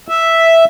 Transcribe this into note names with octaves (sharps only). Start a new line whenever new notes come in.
E5